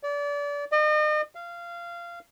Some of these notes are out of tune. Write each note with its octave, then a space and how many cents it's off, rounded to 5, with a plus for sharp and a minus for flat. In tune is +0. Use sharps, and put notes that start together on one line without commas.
D5 -30
D#5 -40
F5 -20